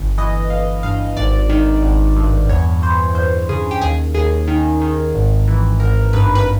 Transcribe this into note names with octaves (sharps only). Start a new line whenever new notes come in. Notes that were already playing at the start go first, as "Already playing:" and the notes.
Already playing: G1
E3 D#5
G1 F5
G2 F5
G#1 D5
D#3
G#1
G2
E2 C#5
E3 C5
E2 C5
C#3 G#4
G4
D#2 G#4
D#2 G#4
D#3
D#3
G#1
E3
G#1 A#4
G2 B4
B4